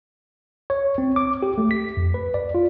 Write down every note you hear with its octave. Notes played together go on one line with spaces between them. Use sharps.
C#5
C4
D6
G4
A3
B6
F2
B4
D5
F4